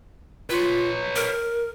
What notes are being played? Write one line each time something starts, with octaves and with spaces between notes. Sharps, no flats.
F4 B4 C#5
A#4